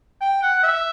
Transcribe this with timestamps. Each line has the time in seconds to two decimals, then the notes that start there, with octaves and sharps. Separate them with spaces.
0.21 G5
0.43 F#5
0.63 E5